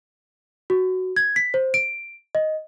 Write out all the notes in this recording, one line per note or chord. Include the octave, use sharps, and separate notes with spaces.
F#4
G#6
B6
C5
D7
D#5